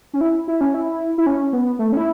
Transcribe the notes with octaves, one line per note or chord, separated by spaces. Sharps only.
C#4
E4
E4
C#4
E4
E4
C#4
B3
A3
C#4
E4